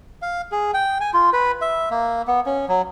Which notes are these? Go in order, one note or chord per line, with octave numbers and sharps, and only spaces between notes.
F5
G#4
G5
G#5
F4
B4
E5
A#3
B3
C#4
F#3